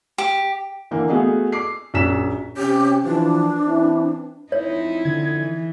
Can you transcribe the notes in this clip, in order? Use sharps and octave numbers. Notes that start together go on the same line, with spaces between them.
G4
D3 E3 A#3
A3 B3 F#4 G#4 D#5 F5
D6 C7
A#1 F#2 B6 E7
C3 C#4 G4
E3 F3 D4
E3 C4 E4
F2 D#4 E4 C#5
D3 G#6
E3